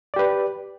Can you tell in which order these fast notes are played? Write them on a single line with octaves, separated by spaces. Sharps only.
D5 G4 B4